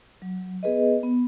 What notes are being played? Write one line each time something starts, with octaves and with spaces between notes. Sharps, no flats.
F#3
B3 G#4 B4 D#5
B3